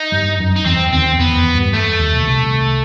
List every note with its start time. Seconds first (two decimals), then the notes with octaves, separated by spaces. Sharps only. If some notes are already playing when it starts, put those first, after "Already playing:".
Already playing: D#4
0.12 G2 G3
0.39 F#2 F#3
0.56 D#4
0.65 E2 E3 C4
0.92 D#2 D#3 C4
1.19 E2 E3 B3
1.37 E2 E3
1.54 G2 G3
1.73 A3
1.99 D#2 D#3
2.14 B2
2.25 C2 C3